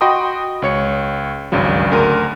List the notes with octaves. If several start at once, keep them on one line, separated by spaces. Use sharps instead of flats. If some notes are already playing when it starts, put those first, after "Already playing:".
F#4 D#5 G5 B5 C6 D#6
C#2 C#5 C#7
G#1 C#2 G2 C#3 F#3
D2 A#4 C6 D#7